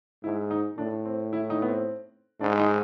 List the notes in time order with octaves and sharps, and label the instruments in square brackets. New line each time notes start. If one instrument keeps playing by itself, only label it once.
[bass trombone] G#2 [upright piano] E4
[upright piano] D#4
[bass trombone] A2 [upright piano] D4
[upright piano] C4
E4
D#4
B3
C4
[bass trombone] G#2 [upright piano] D4
[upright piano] D#4